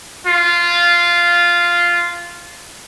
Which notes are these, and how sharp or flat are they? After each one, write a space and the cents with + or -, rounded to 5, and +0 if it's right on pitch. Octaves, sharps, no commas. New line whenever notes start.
F4 -10